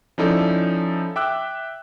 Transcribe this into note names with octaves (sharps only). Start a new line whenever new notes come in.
F3 C#4 D#4 E4 A4 D5
E5 G5 D6 E6 F#6